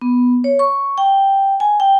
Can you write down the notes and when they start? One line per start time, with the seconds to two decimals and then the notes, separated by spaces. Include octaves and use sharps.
0.01 B3
0.44 C#5
0.59 C#6
0.98 G5
1.60 G#5
1.80 G5